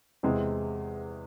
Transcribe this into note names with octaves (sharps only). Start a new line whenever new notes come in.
E2 C3 E3 G#3